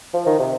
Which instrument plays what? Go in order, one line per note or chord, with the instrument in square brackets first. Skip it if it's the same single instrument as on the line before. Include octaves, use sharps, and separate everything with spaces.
[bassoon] F3
D#3
C3